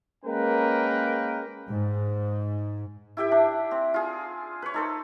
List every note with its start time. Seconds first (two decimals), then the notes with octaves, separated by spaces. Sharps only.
0.25 G#3 A#3 C#4 A#4 B4 G5
1.70 G#2
3.17 E4 G4 E5 G5
3.32 D4
3.71 C4
3.94 F4 G#4
4.62 B4 C#5
4.74 D#4 A4 C5